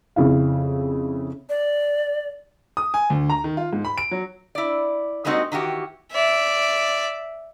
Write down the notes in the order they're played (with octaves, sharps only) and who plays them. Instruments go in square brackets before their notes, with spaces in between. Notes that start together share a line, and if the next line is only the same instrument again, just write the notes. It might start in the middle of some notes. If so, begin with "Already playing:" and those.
[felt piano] F2 C#3 E4 F5
[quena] D5
[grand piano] D#6
G#5
D2
A#5
D#3
F4
G#2
B5
D7
F#3
[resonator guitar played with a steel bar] E4 D5
G3 G#3 A#3 C4 D#4 F#4
D#3 E3 F#4 G4
[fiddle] D5 E5